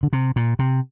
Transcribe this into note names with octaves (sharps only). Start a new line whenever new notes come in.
D3
C3
A#2
C3